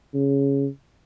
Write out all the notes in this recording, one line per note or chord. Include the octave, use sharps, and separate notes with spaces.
C#3